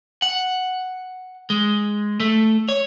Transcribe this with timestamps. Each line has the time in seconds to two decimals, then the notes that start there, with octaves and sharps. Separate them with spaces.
0.22 F#5
1.50 G#3
2.20 A3
2.69 C#5